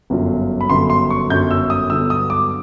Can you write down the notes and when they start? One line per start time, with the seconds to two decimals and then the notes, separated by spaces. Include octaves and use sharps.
0.10 G1 F#2 D3 F#3
0.61 B5
0.70 G1 F#2 D3 F#3 C6
0.90 C6
1.10 C#6
1.30 G1 F#2 D3 F#3 G6
1.51 E6
1.70 D#6
1.90 G2 D3 F#3 B3 E6
2.10 D#6
2.30 D6